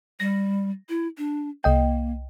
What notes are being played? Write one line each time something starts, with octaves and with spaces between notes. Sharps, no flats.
G3 A#6
E4
D4
C2 A#3 D#5 G5